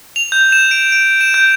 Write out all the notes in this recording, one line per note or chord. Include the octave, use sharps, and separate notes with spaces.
F7
G6
E7
D7
D7
E7
G6